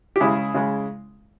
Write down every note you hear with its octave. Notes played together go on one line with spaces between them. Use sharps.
G4
C#3 G#3 E4 G#4
C#3 G#3